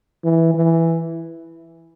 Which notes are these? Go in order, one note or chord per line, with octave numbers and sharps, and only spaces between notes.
E3
E3